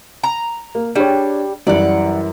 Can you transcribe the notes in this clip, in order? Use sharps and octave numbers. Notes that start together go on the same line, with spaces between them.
A#5
A#3
G3 D4 G#4 C#5
F#2 E3 G3 D5 F#5